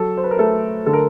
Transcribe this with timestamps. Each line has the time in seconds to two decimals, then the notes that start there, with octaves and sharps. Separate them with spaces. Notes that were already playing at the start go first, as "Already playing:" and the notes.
Already playing: F#3 A4
0.17 C5
0.24 B4
0.31 A#4
0.39 A3 A4
0.86 D3 A4
0.93 A#4